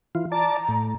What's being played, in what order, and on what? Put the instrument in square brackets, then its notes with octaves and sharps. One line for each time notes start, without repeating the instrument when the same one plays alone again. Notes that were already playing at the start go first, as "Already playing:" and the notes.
[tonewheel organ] E3 F4
[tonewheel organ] D5 A5 [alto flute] A#5
[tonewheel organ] A2